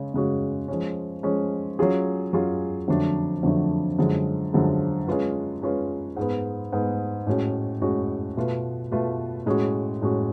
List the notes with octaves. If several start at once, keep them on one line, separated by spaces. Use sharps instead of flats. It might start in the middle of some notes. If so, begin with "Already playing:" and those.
Already playing: C#3 G#3 C#4
C#3 G#3 C#4 F#4
F3 G#3 C#4
F3 G#3 C#4
F#3 C#4 F4 G#4
F#3 C#4 F4 G#4
F2 D3 F#3 A3 D4
F2 D3 F#3 A3 D4
F#2 D3 F3 G#3
F#2 D3 F3 G#3
G#3 C#4 F4 B4
G#3 C#4 F4 B4
G#2 G#3 B3
G#2 G#3 B3
A2 G#3 C#4 F#4
A2 G#3 C#4 F#4
B2 A3 F4 B4
B2 A3 F4 B4
A2 G#3 C#4 F#4
A2 G#3 C#4 F#4